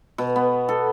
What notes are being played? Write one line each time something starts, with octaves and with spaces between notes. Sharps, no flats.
B2
B3
A4